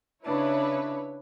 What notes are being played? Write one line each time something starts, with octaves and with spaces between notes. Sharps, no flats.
C#3 D4 E4 B4 C#5